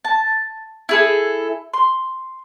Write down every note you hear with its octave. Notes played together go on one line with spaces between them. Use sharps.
A5
E4 G#4 A4
C6